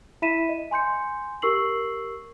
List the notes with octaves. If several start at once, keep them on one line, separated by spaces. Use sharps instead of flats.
E4 E5 B5 B6 D#7 E7
D#5
G#5 C6 G6 C#7
G4 A#4 C#6 E6 C7 F#7